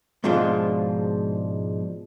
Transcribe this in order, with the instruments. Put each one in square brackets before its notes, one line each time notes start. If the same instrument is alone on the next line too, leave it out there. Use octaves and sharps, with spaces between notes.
[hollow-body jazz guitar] G#2 B2 F3 G#3 D4 F4